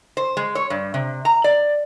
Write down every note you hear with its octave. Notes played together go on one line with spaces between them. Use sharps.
C5
G#3
C#5
G2
C3
A#5
D5